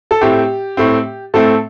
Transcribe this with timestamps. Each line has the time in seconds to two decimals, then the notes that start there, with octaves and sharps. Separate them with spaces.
0.11 A4
0.21 A2 A3 C4 G4
0.77 A2 A3 C4
1.34 A2 A3 C4 A4